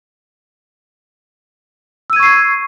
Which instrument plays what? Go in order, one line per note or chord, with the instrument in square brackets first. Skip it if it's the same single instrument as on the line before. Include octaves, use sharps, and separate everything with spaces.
[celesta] E6
D#7
G#6
C#6
C7